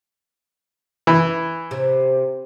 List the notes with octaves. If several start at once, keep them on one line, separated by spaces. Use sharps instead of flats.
E3
C3